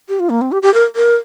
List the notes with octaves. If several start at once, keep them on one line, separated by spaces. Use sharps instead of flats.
G4
F4
A#3
C4
G4
G4
A#4
A#4